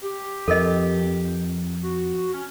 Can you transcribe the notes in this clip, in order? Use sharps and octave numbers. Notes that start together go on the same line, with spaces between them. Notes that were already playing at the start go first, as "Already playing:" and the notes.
G4
F2 A4 A#4 D#5
F#4
C#4